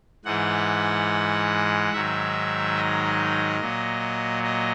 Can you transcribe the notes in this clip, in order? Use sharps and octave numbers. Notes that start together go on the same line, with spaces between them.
G#2 E3 G#3 F#5
G#2 D#3 F#3 E5
D#5
A#2 F#3
D#5